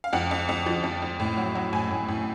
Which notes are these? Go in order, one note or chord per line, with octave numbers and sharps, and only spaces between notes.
F5
F2 F#5
F2
F2
F3
F2
F2
A2
F#3
F#3
A2 G#5
A2
A2